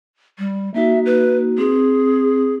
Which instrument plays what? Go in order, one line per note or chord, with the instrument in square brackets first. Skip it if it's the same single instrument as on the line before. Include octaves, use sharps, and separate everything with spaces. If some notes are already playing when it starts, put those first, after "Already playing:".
[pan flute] G3
[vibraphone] A#3 D#4 F#4 [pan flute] E5
[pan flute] B4
[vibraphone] C4 [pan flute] G#4